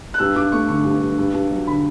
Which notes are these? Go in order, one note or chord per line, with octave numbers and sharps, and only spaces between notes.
F#6
G2 E6
G2 D6
A3 C#6
D3 C#6
G2
G2
G2
G2
F#3
D3 B5